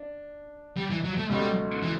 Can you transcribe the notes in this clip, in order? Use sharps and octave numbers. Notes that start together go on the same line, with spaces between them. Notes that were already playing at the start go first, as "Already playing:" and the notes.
Already playing: D4
G3
E3
F#3
A3
C#2 B2 G3 A3
E3